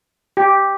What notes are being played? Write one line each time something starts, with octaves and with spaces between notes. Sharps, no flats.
G4